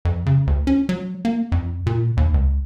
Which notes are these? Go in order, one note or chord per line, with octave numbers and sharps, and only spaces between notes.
F2
C#3
D2
C#4
F#3
A#3
F2
A#2
D#2
C#2